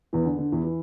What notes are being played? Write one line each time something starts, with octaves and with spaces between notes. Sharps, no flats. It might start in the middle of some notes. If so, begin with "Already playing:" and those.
E2 E3
D3
D3
E2 E3
E3